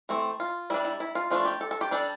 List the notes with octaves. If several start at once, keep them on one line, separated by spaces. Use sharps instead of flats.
E3 A3 C4
F4
G3 D4 E4
E4
E4
F4
F3 A3 D4 F4
G4
A4
A4
G4
G3 D4 A4